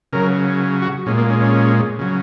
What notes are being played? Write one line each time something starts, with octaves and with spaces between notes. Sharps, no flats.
C#3 F#3 A#4
F#4
A#2 G#3 C#4
A#3
C#4
C#4
C#3 F#3